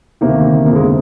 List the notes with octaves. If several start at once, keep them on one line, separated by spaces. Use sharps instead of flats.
D2 C3 D#3 A#3
G1 F2 C3 F3 A#3
G#3